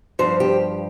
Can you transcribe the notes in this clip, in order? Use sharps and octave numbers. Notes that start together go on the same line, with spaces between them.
G2 F3 C5
G4